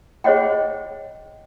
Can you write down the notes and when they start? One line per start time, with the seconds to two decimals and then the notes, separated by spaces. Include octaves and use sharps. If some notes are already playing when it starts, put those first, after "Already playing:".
0.24 G#4 C5 C#5 D#5 F#5 G5